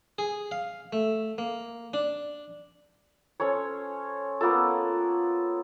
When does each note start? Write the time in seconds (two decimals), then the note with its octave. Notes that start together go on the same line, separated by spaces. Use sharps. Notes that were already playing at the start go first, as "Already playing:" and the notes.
0.18 G#4
0.51 F5
0.93 A3
1.38 A#3
1.94 D4
3.40 C#4 A4 C5 C#5
4.41 A#3 B3 F4 A4